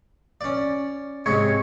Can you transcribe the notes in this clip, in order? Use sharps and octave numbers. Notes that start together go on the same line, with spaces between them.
C#4 D5
G#2 C3 G#3 C#5